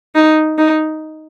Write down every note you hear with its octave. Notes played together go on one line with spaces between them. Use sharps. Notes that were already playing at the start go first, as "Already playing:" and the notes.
D#4
D#4